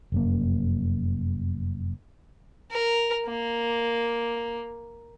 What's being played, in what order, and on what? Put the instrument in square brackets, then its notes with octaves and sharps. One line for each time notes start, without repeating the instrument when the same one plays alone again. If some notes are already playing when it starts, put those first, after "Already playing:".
[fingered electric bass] F1 F#2 A#3
[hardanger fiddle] A#4
A#3